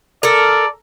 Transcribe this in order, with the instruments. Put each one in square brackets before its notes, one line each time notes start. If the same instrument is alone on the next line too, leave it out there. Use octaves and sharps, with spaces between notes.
[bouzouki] A4 A#4 [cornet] D5